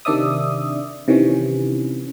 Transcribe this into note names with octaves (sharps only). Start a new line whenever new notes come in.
C3 D#3 D4 D5 E5 D#6
C3 D#3 E3 C#4